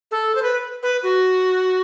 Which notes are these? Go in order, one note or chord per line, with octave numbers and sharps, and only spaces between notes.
A4
C5
B4
B4
F#4